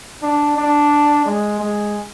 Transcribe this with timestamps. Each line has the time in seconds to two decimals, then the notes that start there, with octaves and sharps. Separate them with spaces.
0.22 D4
0.57 D4
1.26 G#3
1.60 G#3